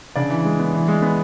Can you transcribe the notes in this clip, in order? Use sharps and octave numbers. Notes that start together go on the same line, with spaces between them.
C#3 D4 D5
E3
G#3
B3
E3
G#3
B3